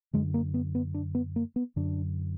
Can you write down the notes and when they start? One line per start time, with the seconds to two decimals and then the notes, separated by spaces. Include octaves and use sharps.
0.13 F#2 D3 G#3
0.34 A#3
0.54 B3
0.75 B3
0.94 D4
1.15 B3
1.36 A#3
1.56 B3
1.76 F#2 D3 D4